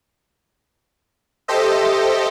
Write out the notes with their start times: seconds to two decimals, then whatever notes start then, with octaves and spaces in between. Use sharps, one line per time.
1.48 G4 A4 C5 D#5 E5